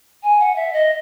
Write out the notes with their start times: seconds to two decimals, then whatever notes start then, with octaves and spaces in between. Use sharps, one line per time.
0.23 G#5
0.40 F#5
0.56 E5
0.73 D#5